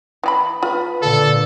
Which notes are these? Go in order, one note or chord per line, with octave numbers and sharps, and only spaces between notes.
E3 G#4 B5
F4 B4 A5
A#2 D3 A4 D5 F5